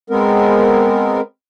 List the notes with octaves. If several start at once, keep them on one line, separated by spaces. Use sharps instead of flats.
G#3 B3 C4 A#4